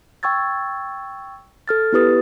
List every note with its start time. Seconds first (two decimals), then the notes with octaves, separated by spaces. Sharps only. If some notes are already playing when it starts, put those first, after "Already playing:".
0.23 G5 C#6 E6 G#6 A6
1.68 A4 F6 A6
1.92 B3 E4 G4 B4 D#6 A6